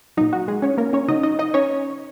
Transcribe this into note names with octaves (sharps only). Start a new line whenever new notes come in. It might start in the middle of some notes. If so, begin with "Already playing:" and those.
A#2 F#3 D#4
F#4
G#3 G#4
C#4 C#5
A#3 A#4
C#4 C#5
C#3 F#3 D#4 D#5
D#4 D#5
D#4 D#5
C#4 C#5